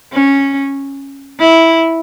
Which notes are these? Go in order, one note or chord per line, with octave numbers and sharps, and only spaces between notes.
C#4
E4